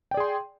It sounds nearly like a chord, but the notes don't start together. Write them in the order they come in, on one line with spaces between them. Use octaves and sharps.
G5 D5 G#4 C6